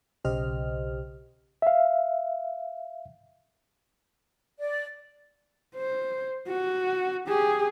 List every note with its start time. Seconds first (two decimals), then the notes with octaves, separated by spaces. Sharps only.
0.24 B1 C#3 G4 C5 D#5 F6
1.62 E5 F5
4.60 D5
5.75 C5
6.48 F#4
7.28 G4 G#4